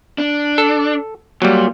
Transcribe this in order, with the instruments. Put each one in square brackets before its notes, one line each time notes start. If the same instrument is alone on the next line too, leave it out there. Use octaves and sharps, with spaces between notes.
[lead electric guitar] D4
[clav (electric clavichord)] A4
[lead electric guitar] A#2 [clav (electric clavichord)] F#3 G3